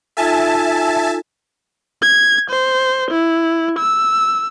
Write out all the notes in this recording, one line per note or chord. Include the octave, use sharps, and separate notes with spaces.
D#4 F4 A4 E5 G#5 A5
G#6
C5
E4
E6